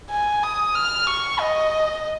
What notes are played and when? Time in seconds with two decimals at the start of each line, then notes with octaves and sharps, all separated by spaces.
0.11 G#5
0.43 D#6
0.75 F6
1.07 C#6
1.40 D#5